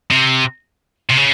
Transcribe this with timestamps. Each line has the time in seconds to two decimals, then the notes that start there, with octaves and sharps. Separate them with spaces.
0.11 C3
1.09 C3
1.17 C#3